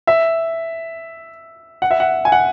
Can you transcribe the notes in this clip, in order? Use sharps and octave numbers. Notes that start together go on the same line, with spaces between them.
E5
F#5
E5
F#5
G#5
F#5